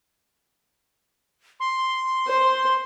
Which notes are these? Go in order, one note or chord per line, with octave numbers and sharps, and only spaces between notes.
C6
C5